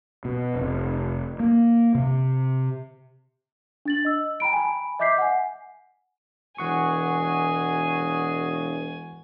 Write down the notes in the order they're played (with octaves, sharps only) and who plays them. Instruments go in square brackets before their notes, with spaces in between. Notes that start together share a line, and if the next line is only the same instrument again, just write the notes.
[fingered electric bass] B2
F1
A#3
C3
[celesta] D4 A6 F#7
D#5 E6
G5 A#5 B5 D7
G#5 B5
D#5 E5 D6 G6 B6 C7
F#5 G#5
[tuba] E1 [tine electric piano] E3 F#5 C#6 [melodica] F#4 G#4 [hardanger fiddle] G#5